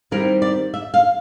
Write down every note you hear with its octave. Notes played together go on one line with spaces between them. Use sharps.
D#3 G3 C4 E4 A#4
D5
E5
F5